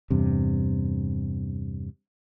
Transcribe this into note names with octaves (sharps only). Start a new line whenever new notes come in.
E2 G2 C3